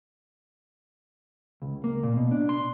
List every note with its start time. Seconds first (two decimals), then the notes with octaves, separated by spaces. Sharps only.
1.62 C#2
1.84 A#3
2.03 A#2
2.17 B2
2.31 D4
2.49 C6